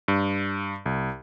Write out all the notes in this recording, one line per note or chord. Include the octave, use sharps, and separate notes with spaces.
G2
C2